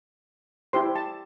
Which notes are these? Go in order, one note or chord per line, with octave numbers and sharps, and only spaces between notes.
E4 G4 C5 C6
A5